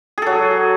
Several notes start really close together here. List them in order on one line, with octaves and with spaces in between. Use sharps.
G#4 A4 F#3